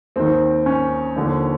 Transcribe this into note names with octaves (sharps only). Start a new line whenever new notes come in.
D#2 D#3 C4
C#4
D#2 D3 F3